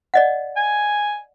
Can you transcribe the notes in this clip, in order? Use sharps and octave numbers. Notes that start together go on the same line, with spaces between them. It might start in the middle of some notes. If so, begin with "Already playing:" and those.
D5 D#5 F#5
G#5